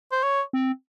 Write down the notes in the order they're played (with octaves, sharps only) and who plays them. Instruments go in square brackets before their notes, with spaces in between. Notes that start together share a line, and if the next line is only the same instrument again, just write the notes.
[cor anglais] C5
C#5
[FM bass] C4